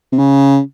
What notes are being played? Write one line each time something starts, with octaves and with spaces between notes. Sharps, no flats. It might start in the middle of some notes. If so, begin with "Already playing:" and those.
C3
C#3